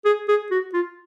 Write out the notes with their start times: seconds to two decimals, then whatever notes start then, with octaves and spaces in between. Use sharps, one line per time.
0.05 G#4
0.29 G#4
0.51 F#4
0.74 F4